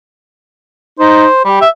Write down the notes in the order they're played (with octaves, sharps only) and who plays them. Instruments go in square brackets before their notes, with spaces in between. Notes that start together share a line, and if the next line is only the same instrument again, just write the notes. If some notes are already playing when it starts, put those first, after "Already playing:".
[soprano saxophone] D#4 [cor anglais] C5
[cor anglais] G3 [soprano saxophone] G4
[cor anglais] E5